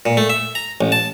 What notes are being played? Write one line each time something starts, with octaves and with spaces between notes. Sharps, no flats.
A#2
A3
E5
A#5
A1
A5